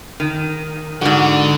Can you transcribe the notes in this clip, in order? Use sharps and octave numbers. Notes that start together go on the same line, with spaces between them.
D#3
G#2 D3 F#4 D5